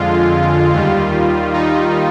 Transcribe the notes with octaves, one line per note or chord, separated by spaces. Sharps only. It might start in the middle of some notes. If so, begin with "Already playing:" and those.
Already playing: F2 D3 G#3 F4
D#2 D#3 G3 F4
D#4